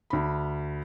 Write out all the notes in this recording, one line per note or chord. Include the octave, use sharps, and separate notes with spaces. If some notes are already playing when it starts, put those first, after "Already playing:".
D2 B5